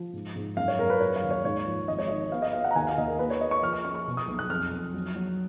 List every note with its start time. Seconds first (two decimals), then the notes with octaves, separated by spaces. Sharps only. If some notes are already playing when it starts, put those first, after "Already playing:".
Already playing: F3
0.13 G#2
0.36 G#2
0.57 F#2 F5
0.68 C#5
0.79 F#2 A#4
0.90 B4
1.00 F#3 C#5
1.16 F5
1.23 D#2
1.31 C#5
1.44 G#2 C#5
1.66 F3
1.88 G#1 D#5
1.98 C#5
2.08 D#3 D#5
2.32 B3 F5
2.42 D#5
2.53 B3 F5
2.64 F#5
2.71 A#5
2.76 D#2 G#5
2.87 F5
2.98 D#2 D#5
3.08 A#4
3.19 A#3 B4
3.30 C#5
3.41 A#3 D#5
3.51 C#6
3.62 F3 F6
3.73 F6
3.84 C#4 C#6
3.95 C#6
4.07 B2
4.17 D#6
4.28 B1
4.39 F#6
4.50 F2 F6
4.72 F2
4.94 F#3
5.16 F#3